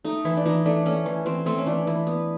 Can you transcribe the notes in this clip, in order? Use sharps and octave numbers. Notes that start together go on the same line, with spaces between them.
A3 D#4
E3 E4
D4
E3 D#4
A3 D4
A3 C#4
E3
E3 C4
A3 C4
C#4
E3 D4
E3 E4
B3